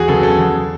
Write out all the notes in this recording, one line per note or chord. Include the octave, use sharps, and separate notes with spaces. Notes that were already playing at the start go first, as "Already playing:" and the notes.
Already playing: E2 F#4 G#4
C#3 F#3 B3 A4
A4
E2